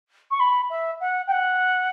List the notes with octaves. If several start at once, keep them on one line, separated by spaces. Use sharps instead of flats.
C#6
B5
E5
F#5
G5
F#5